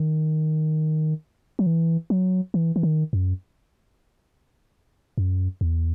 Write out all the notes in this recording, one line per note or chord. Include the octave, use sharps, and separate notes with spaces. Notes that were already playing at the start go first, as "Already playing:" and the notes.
Already playing: D#3
F#3
E3
F#3
E3
E3
D#3
F#2
F#2
E2